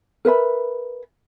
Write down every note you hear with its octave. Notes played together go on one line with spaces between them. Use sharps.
A#4 B4 E5 B5